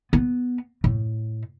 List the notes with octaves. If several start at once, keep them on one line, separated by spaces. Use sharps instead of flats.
B3
A2